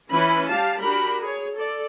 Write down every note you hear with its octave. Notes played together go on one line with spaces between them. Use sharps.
E3 C#4 E4 B4 B5
G3 G4 F5 A5
D4 F#4 G4 A#4 B5
G#4 C#5
A4 D5